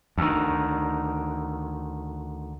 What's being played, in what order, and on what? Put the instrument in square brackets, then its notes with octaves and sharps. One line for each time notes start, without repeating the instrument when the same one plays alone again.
[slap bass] D2 D#3